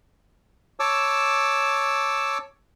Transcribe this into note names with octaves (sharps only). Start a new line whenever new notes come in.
C#5 A5 D6 E6